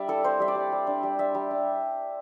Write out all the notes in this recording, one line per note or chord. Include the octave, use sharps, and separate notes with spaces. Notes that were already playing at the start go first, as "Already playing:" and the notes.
Already playing: G3 D4 D5 E5
E4 A4
C4 C5
G3 E5
D5
G3
G3
D4
G3
D4 E5
G3
D4